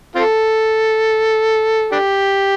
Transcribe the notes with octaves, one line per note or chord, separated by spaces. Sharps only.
C4 F4 A4
D4 G4